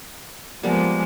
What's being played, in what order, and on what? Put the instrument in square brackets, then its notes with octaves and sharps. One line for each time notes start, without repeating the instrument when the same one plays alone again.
[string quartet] F3 G#3 [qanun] G3 A#3 B3